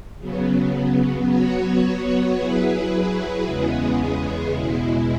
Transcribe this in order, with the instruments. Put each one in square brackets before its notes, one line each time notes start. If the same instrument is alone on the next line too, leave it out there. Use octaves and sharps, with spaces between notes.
[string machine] C#3 F#3 B3
F#3 B3 F#4 C#5
F#3 E4 G#4 B4
E2 C#3 G#3 B3 G#4
E2 B2 G#3 E4